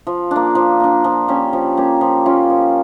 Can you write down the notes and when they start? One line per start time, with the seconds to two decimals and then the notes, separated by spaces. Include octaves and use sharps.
0.07 F3
0.31 A#3 D4
0.55 F3
0.80 A#3 D4
1.04 F3
1.28 A#3 C#4 G4
1.53 F3
1.77 A#3 C#4 G4
2.01 F3
2.26 A#3 C#4 F4
2.50 F3